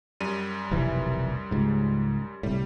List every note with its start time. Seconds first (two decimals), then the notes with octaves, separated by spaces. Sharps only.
0.20 F#2 G3 D#7
0.71 F1 B1 E3
1.51 C#2 G#2
2.43 C2 A2 G3